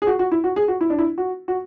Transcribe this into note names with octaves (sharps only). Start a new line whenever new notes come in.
G#4
F#4
F#4
E4
F#4
G#4
F#4
E4
D4
E4
F#4
F#4